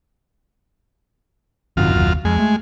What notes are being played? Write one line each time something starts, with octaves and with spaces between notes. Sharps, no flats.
G#1 F#2 C3 D#3 F4
F#1 D#2
F2 G#3
A3